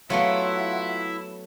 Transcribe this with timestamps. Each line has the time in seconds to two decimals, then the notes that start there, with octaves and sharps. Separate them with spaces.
0.10 F#3 A3 B3 E4 F4 E5 F#5